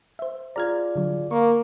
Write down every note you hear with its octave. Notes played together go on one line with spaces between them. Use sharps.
C5 E5
F4 G#4 D5 A#5 F6 G#6
D3 F#3
A#3 C#6